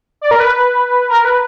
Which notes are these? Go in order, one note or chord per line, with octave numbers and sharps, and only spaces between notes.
D5
A#4
B4
A#4
B4